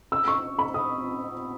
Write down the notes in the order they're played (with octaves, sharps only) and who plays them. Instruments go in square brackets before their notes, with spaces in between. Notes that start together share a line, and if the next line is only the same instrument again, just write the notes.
[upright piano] E6
C#6
B5
D#6